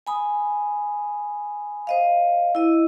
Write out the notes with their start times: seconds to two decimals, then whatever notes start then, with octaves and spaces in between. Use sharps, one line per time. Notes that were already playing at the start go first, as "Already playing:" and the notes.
0.07 G#5 B5 D#6
1.87 C5 D#5 F5
2.55 E4 D#5